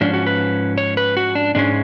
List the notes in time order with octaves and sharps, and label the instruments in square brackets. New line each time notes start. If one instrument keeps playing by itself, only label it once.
[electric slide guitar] G#2 F3 C#4 D4
F#4
B4
C#5
B4
F#4
D4
G#2 G#3 C#4 D4